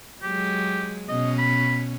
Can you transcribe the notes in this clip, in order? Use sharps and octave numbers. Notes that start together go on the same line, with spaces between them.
F#3 G#3 G4
B2 C#4 D#5
B5